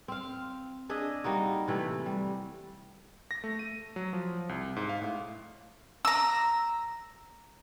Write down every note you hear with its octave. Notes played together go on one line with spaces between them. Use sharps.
C4 F5
D4 G#4 D#5 E5
G3 A#3 D#4 F#4
C3 E3 A3
G3
A#6
A3
D#7
F#3
F3
C2
G#2
F5
A2
A#5 E6